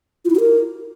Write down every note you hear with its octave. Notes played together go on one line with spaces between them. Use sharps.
F4
E4
F#4
A#4